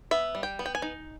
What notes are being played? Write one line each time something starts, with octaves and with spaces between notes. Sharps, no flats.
B3 E5
G3
G5
B3
G5
G#5
D#4